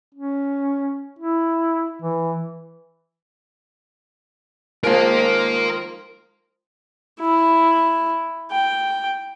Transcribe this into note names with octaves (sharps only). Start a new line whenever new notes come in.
C#4
E4
E3
D#3 F3 G#3 A#4 F5
E4
G5